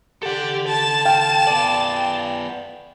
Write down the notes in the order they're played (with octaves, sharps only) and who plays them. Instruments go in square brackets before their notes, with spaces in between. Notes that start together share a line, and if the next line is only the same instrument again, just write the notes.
[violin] G4 [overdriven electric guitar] A4 F#5
[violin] A5 E7
[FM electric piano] F5 G5
[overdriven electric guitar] B3 D5